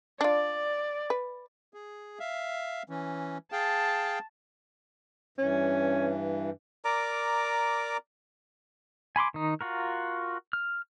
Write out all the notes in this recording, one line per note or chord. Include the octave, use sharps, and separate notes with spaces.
D4 F4 D5
B4
G#4
E5 F5
E3 C#4
G#4 F5 G5 A5
G2 E3 C#4
A#4 D5 A#5 D6
G#5 B5 C6 D6
D#3 D#4
F4 F#4 A#4
F6